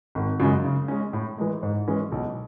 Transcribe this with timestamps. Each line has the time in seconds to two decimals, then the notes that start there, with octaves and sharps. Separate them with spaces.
0.15 G#1
0.40 F#2 C#3 G#3
0.65 C#3
0.88 G#3 C#4
1.13 A2
1.38 E3 G#3
1.63 G#2
1.88 E3 G#3 C#4
2.12 B1